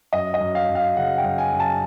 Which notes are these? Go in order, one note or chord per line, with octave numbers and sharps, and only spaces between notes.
F#2 D#5
D#5
F#2
F5
F#2
F5
C#3 F#5
G5
F#2
G#5
F#2
A5